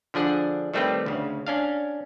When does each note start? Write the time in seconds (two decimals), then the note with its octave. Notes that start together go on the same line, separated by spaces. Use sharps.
0.14 D3 F3 D4 G#4 F#5
0.74 D#3 G3 A3 C4 G4 B4
1.06 D2 C#3
1.47 C#4 D4 F5